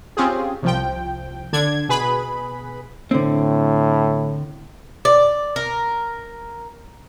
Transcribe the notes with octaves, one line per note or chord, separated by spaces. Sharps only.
C4 C#4 F4 G4 G#4
C2 F3 G5
D3 D4 G#6
B2 G#4 B4 B5
A2 D3 C4
D5
A#4